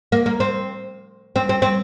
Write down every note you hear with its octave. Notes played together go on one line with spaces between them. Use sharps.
A#3
A#3
C4
C4
C4
C4